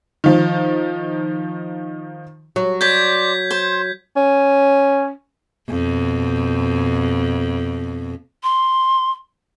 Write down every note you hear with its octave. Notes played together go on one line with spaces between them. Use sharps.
D#3 F3
F#3
C5 D5 G6 G#6 B6
C5
C#4
F2 B2
C6